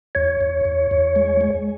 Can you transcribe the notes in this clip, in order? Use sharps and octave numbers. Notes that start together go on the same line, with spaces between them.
E2 C#5
E2
E2
E2
G#3
G#3